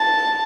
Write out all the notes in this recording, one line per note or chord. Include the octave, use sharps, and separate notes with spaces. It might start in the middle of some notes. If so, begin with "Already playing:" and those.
Already playing: A5